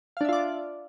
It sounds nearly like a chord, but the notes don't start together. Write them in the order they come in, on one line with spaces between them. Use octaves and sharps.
F5 D4 E5 F4 D5